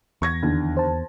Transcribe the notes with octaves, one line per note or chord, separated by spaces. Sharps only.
E2 C#6 G#6 A#6
D#2 D3
C5 A5